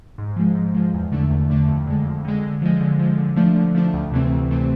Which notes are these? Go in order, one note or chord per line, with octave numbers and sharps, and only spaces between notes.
G#2
F3 G#3
G#2
F3 G#3
E2
D3 A3 D4
E2
D3 A3 D4
F2
D3 G#3
F2
D3 G#3
D3
F3 G#3
D3
F3 G#3
D3
F3 A3 D4
D3
F3 A3 D4
D2
C3 E3 A3 C4
D2
C3 E3 A3 C4